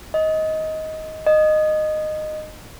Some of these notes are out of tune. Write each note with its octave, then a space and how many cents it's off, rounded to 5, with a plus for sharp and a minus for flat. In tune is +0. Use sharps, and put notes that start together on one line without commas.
D#5 +15
D#5 -15